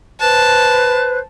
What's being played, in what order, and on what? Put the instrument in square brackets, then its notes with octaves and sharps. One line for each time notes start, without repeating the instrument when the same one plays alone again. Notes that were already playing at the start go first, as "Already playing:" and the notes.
[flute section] B4 C5 F#6 [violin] A5